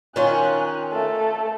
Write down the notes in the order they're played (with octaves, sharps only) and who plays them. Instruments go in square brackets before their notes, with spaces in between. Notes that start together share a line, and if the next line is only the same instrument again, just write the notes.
[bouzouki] D#3 C#4 F4 [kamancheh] G#5 F#6
[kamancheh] A3 A4